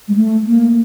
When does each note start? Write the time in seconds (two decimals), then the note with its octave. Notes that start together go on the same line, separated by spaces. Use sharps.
0.08 G#3
0.16 A3
0.47 A#3